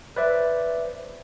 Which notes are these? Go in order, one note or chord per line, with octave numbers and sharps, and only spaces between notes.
B4 C5 D5 E5